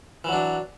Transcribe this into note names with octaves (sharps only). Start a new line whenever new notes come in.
E3 F#3 D4